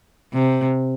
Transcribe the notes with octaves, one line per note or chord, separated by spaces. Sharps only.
C3